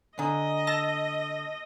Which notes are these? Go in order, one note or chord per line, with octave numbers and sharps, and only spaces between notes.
D3 D#5 G#5 A#5 D#6
A5 E6 A#6